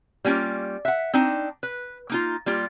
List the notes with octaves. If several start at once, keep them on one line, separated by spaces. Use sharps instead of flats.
G3 A#3 C#4 F4
E5 F#5
C4 D4 D#4
B4
A#3 D#4 F4
G3 A#3 F4